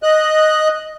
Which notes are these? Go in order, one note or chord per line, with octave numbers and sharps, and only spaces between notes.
D#5 F#6